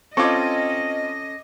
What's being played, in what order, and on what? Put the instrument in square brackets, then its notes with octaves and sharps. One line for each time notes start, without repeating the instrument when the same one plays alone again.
[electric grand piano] C4 F4 [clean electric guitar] C#4 A4 [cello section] D#5 [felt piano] C#6 D6 G#6